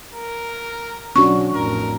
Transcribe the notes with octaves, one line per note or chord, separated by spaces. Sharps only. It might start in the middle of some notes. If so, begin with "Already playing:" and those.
A#4
B1 F#3 C#4 D4 F#4 C#6
A1 F2 A#4